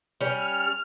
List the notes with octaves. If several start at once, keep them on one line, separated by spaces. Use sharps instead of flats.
G3 C#4 F6